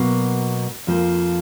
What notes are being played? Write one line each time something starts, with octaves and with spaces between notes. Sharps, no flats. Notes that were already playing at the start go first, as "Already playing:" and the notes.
Already playing: B2 F#3 A#3
F2 F3 A#3